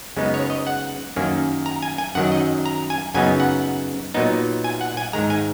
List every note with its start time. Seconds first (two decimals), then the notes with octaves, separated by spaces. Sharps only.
0.17 F#2 C#3 G#3 B3 D#4
0.34 C#5
0.50 D#5
0.67 F#5
1.16 F#2 D#3 A#3 C#4
1.66 A#5
1.82 G#5
1.98 G#5
2.15 F#2 D#3 F#3 F#5
2.32 D#5
2.66 A#5
2.90 G#5
3.14 F#2 C#3 F#3 B3 D#4 G#5
3.40 F#5
4.14 A#2 F#3 B3 D#4
4.64 G#5
4.81 F#5
4.97 G#5
5.13 G#2 D#3 G#3 A#5
5.30 G#5